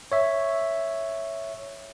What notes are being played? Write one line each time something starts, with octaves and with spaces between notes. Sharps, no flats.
C#5 E5